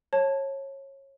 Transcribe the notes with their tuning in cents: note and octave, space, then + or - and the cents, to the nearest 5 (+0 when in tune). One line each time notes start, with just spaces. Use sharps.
C#5 -25 A5 +0